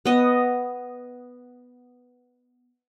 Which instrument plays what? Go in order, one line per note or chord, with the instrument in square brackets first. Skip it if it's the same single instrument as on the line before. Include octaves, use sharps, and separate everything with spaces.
[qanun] B3 D#5